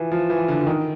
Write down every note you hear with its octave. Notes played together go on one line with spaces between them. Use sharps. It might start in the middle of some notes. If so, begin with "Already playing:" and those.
Already playing: E3 F3
F3
E3
D3
D3
D#3